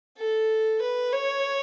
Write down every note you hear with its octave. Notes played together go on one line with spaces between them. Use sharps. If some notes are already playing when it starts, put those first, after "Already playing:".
A4
B4
C#5